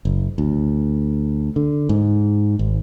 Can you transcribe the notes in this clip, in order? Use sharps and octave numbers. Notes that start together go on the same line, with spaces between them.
F#1
D2
D3
G#2
G#1